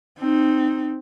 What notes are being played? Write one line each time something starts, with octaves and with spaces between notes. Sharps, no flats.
C4 D#4